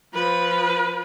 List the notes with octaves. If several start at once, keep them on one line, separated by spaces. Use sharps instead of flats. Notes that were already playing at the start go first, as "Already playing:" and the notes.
F3 B4